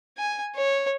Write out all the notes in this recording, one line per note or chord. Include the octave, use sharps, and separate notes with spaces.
G#5
C#5